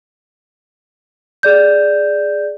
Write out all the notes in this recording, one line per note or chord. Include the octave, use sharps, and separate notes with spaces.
G#4 D5 G6